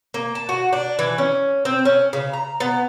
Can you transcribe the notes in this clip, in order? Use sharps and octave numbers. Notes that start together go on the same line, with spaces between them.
A#3
A5
F#4
D4
E3
C#4
C4
C#4
C#3
A#5
B3